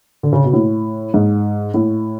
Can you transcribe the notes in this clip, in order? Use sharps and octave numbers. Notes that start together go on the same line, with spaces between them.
D3
C#3
B2
A2
G#2
A2